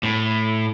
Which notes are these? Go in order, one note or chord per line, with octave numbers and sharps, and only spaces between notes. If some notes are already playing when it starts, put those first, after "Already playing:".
A2